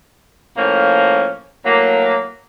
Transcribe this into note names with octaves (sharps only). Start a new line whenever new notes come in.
A2 F3 A#3 C#4
A2 F#3 A#3